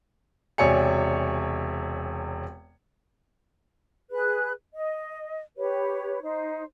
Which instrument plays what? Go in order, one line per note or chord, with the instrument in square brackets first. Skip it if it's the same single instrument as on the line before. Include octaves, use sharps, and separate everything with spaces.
[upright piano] E1 C3 C#5 D5 G#5 C#7
[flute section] G#4 B4 F#6
D#5
G4 B4 C#5
D#4 C5